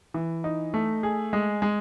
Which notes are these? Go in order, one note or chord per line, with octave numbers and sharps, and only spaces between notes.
E3
D#4
A3
G#4
G#3
G#3